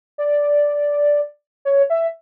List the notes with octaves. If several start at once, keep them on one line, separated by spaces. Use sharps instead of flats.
D5
C#5
E5